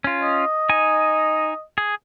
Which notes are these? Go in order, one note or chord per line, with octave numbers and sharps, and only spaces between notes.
C#4 F4
D#5
D#4 G#5
G#4